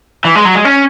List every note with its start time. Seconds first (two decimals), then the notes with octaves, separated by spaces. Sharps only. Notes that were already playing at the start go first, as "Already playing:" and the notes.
0.25 E3
0.35 G#3
0.45 F#3
0.55 G#3
0.65 C#4